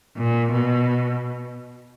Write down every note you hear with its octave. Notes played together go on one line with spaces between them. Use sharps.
A#2
B2